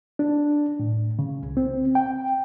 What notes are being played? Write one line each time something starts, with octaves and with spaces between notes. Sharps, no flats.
D4
A2
C#3
C2
C4
G5